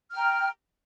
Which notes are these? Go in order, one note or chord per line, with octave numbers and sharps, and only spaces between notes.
G5 A#5 F6